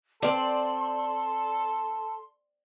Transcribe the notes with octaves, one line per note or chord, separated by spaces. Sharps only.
C4 A4 C5 D5 C6